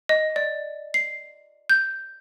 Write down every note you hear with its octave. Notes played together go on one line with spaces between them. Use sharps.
D#5
D5
C7
G6